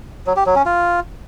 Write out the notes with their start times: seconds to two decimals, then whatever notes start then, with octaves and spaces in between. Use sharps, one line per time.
0.27 F#3
0.36 G4
0.46 F#3
0.56 C#4
0.66 F4